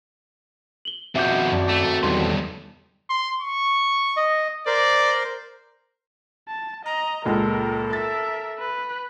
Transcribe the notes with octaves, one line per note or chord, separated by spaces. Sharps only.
F#7 G7
F2 B2 C4 F#4 E5 D6 G6
F#2 D5 A5
A3
B1 E2 G2 D#3 A4 C6
C6
C#6
D#5
A#4 C5 D5
A5
D#5 A#5
C#2 A#2 G#3 A4 A#4
A#4 E5 A6
B4